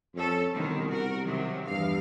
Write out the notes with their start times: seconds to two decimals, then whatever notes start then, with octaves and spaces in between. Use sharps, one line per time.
0.15 F2 C#4 A4
0.54 C2 B2 D3 D#3
0.90 F#4 A#4
1.24 C3 D#3 F#3
1.67 E2 G2 F5